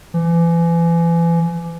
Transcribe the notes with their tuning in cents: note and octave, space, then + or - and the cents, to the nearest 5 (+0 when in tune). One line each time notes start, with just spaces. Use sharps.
E3 +35